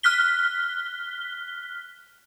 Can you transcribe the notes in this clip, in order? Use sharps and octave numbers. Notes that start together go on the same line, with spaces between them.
F6 F#6 B6 G7